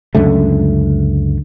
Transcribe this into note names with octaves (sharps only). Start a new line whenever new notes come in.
C#2 F#2 D3 A3